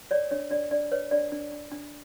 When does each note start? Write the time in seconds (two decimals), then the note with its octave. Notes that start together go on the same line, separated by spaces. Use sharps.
0.11 C#5 D5
0.31 D4 C#5
0.51 D4 D5
0.71 D4 D5
0.92 B4 C#5
1.11 D4 D5
1.32 D4
1.52 D4
1.72 D4